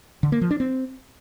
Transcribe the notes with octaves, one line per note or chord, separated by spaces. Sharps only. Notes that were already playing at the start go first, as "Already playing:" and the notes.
D3
A#3
F3
D4
C4